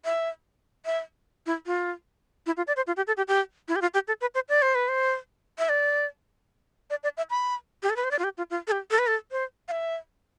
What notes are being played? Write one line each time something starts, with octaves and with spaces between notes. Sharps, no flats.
E5
E5
E4
F4
E4
F4
D5
C5
F4
G4
A4
G4
G4
E4
G4
F4
G4
A4
B4
C5
D5
C5
B4
C5
E5
D5
D5
D5
E5
B5
G4
A4
B4
C5
D5
F4
G4
F4
F4
A4
G4
A4
B4
A4
C5
F5
E5